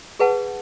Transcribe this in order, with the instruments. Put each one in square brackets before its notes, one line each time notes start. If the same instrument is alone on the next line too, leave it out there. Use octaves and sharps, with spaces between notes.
[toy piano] G#4 B4 F#5 A5